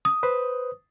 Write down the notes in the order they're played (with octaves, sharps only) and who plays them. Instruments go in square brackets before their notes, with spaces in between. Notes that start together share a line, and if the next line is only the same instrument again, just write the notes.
[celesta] D#6
[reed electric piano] B4 C5